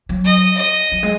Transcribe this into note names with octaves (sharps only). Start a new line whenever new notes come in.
F#3
D#5
D#5
F#3
G#3